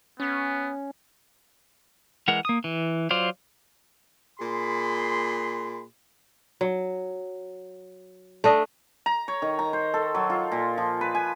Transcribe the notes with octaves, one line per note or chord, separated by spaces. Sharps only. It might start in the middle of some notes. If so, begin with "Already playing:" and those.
B3 C#4
E3 G#3 A#4 F#5
A#3 D#6
E3
F#3 F4 C5 D5 F5
A#2 G#4 B5 C6
F#3
A3 D4 D#5
A#5
C#5
D#3
A#5
C5
A4
F#3
F4
A#2
F3
B4
G#5